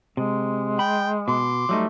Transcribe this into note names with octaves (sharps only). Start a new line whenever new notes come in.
C3 G#3
G5 B5
B2 C6 D6
F#3 G3 A3 D#4